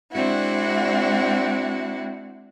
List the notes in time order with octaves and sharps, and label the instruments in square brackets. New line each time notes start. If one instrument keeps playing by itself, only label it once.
[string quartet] G#3 C4 D4 E4 F#4